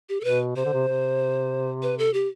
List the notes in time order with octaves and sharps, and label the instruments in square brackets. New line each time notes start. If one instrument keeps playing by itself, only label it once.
[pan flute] G4
A4
[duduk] B2 [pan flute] B4
[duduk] C3 [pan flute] C5
[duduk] D3
C3
C3
[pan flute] B4
A4
G4